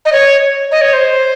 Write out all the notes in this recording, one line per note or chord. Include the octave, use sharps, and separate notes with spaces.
D#5
C#5
D#5
C#5
C5